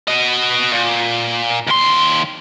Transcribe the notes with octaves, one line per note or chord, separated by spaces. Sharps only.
F#4 D#5
A#2
D#2 C6